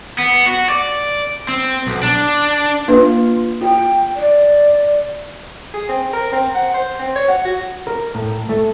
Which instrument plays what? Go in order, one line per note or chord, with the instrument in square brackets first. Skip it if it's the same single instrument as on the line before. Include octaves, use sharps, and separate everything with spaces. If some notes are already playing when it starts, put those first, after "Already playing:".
[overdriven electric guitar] B3
F#4
D5
C4
B1
D4
[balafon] A#3 D4 B4 [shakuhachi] F4
[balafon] F4 [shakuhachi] G5
[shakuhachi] D5
[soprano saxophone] G#4
C4
A#4
C4
F#5
C5
C4
C#5
F#5
F#4
[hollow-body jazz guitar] A#4
A2
A3